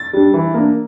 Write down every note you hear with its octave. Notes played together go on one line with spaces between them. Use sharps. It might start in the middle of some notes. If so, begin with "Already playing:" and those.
Already playing: A6
G3 D4
E3
A#3 D4